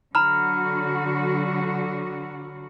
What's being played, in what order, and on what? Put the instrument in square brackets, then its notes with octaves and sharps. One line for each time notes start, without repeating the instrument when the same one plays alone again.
[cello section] D3 F#3 F#4 [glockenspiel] A#5 B5 F6